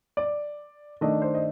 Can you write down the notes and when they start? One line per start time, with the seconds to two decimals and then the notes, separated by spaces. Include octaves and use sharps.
0.17 D5
1.01 D#3 A3 D4 D#5
1.22 C5
1.35 D#5